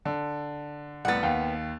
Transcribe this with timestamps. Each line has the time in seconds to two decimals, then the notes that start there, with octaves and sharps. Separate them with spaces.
0.05 D3
1.05 C2 A2 B3 F#5 A6
1.23 D#2 F5 G5